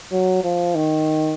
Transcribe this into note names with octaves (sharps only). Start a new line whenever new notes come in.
F#3
F3
D#3